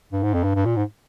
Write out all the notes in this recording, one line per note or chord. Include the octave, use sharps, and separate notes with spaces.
G2
G#2
F2
G2
G2
A#2
G#2